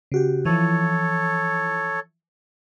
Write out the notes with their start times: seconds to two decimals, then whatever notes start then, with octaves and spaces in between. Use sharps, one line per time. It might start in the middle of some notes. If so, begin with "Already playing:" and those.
0.12 C#3 F#4 G4
0.45 E3 F3 A4 C#5